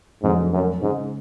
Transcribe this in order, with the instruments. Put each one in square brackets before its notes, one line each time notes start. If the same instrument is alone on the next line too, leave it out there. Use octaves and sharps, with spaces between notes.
[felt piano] F1 F2 D3 F#3 [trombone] G#2
[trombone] F#2
[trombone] G#2 [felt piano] C#3 G#3 C#4